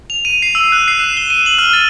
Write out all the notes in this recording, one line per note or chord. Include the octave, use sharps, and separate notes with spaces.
F7
D#7
C7
E6
F#6
C7
E7
G7
D#7
F#7
F6
A6